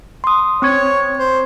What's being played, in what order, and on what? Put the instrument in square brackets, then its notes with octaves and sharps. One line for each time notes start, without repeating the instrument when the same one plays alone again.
[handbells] C6 D#6
[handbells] C4 C#6 G#6 [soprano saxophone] C#5
[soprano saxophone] C5